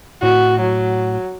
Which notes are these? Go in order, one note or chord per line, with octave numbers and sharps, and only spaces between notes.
A2 F#4
F#3